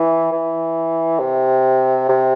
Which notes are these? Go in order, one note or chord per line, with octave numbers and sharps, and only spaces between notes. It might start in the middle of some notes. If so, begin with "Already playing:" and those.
Already playing: E3
E3
C3
C3